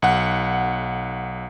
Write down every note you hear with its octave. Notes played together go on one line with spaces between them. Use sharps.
B1 F#5